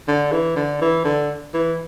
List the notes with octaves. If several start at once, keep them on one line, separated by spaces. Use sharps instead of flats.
D3
E3
D3
E3
D3
E3